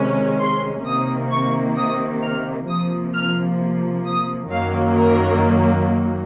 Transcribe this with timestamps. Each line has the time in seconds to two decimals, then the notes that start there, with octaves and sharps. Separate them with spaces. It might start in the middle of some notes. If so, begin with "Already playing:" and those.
Already playing: C3 D#3 G#3 C#4
0.40 C6
0.85 C3 D#3 A#3 D#6
1.31 C#6
1.77 D#6
2.22 F6
2.68 C3 F3 A#3 D#6
3.14 F6
4.05 D#6
4.51 F#2 D#3 F#3 A#3 F5
4.97 A#4